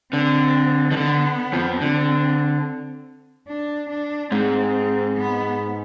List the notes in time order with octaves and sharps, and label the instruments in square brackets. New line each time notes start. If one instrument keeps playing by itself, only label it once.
[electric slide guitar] D3 [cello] C4
[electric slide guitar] D#3
[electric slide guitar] D3 [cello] B3
[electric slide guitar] F2 F3
[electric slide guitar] D3 [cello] C4
[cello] D4
D4
[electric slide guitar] G#2 G#3 [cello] C4
[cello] B3